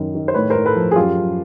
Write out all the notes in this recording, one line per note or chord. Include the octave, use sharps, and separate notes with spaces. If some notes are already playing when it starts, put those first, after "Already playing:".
Already playing: F#2 D#3
D#3
C5
A2 B4 C#5
A2 A#4 C5
A4 B4
F3
G#4
F#2 F4 G4
F#2